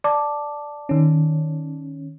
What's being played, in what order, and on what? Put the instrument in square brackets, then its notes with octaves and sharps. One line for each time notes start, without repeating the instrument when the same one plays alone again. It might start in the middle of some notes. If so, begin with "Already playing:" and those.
[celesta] D5 A5 D6
[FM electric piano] D#3 C#4